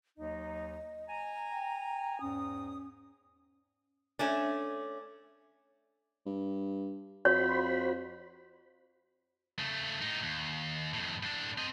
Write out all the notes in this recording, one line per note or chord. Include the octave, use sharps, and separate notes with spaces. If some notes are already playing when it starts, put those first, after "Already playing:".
D#2 F#3 D#4 D#5
G#5 A#5
G5
E2 G#2 C#4 D#6
A3 C#4 D4
G2
F2 F#4 C5 C#5 B5
C#3 A3
A2 D#4
D#2
F2 A2
A2 D4
C4 D#5